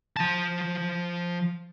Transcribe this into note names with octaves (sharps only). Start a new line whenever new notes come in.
F3 A5